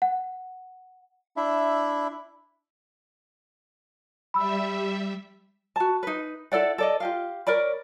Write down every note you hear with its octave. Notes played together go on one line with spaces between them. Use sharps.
F#5
D4 E4 E5
G3 E5 B5 E6
F#4 A5
D#4 B4
E4 A4 D5 F#5
A4 D5 D#5
F4 G4 F5
A#4 C#5 D5 B5